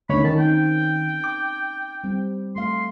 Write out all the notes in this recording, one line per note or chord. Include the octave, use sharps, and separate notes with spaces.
D2 A#3 C#4 D#4 C#5 B5
D#3 A5
A#3 C4 D#4 G5
D6
G3 C4
A3 F5 C6